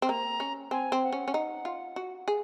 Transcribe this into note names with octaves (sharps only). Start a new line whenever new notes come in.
C4
A#3 A#5
C#4
C4 G#5
C4
F#5
C#4
C#4
D#4
F4
F#4
G#4